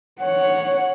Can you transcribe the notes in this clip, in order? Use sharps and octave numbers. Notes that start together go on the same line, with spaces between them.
C#5 F#5